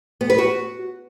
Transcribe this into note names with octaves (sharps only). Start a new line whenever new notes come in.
B3
B4
F#4